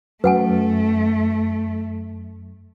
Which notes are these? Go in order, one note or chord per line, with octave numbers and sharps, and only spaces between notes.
F#2 A3 B4 F#5 G#5